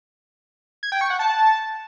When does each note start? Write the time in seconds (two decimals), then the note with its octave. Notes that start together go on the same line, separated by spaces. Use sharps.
0.83 G#6
0.92 G5
1.01 C#6
1.10 F#5
1.19 A5